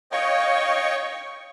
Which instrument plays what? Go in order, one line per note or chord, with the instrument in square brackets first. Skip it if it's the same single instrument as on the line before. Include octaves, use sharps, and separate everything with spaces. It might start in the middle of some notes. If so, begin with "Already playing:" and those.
[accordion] C#5 D#5 G5 [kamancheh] F5 C#6